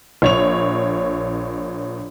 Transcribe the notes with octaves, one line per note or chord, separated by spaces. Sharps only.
A#1 C#5 F7